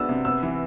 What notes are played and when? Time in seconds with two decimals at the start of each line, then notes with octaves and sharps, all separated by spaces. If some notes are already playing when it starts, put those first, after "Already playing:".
Already playing: F#3 B3 D4 E6
0.09 C3
0.25 B3 E6
0.43 E3